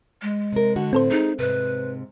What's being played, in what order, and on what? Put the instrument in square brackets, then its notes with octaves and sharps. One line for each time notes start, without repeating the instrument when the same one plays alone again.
[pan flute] G#3
[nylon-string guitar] C3 A#4
D3 F#4
[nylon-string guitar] A2 D3 [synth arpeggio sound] C4 A4 C5
[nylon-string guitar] G#3 [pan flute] D#4
[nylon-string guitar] G#2 C3 [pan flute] B4